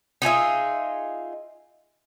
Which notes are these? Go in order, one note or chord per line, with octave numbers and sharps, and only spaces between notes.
D#4 F4 G#4 E5